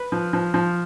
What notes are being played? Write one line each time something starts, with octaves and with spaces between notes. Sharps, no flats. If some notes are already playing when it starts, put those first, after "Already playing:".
Already playing: B4
F3
F3
F3